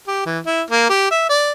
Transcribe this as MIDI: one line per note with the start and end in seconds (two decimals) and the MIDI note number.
0.07 0.23 67
0.26 0.39 52
0.46 0.62 64
0.71 0.88 58
0.89 1.08 67
1.11 1.25 76
1.29 1.52 74